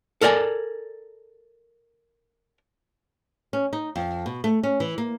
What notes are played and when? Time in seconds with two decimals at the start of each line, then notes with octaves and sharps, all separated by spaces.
0.21 A4 A#4 D5 F#5 G#5
3.53 C#4
3.73 D#4
3.96 F2
4.26 B2
4.44 A3
4.63 C#4
4.80 E3
4.98 A#3